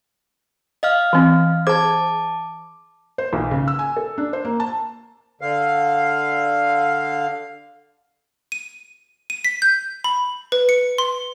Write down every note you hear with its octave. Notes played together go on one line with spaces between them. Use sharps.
D#5 F5 F6
E3 C4
G#4 C5 A5 D6
C5
B1
C#3
E6
G#5
A4
D4
C5
A#3
A5
D3 F5
D#7
D#7
B6
G6
B5
B4
C#7
C6